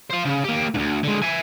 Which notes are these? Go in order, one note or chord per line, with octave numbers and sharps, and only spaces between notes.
C5 F5
C#3
A#3 G4
D2 G#2
D3 G#3
E5 G#5